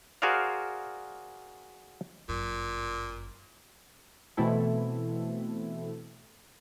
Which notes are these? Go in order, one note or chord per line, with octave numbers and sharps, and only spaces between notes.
F#4 G#4 A#4 C5 D5 F5
G1 F#2 A#2
B2 E3 A3 C4 E4 A4